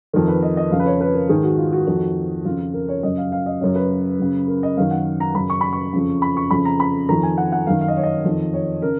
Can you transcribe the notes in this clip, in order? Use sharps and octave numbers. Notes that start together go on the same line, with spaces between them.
F2 D#3 A#4
B4
D#5
D#5
F2 C#3 F5
B4
C#5
B4
A#4
G#2 D#3 G#4
F#4
F4
F#4
F2 D#3
F2 C#3 F4
A#4
C#5
F#2 C#3 D#5
F5
F5
D#5
F#2 C#3 C#5
B4
F#2 C#3
A#4
D#5
F#2 D#3 F5
F#5
A#5
F#2 C#3 B5
C#6
B5
C#6
F2 C#3
B5
C#6
F2 C#3 B5
A#5
B5
F2 D#3 A#5
G#5
F#5
F#5
F#2 D#3 F5
F5
D#5
C#5
D#5
F2 D#3
C#5
C#3 A#4